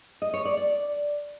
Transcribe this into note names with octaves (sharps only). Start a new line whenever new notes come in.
D#5
C#5
D5
D5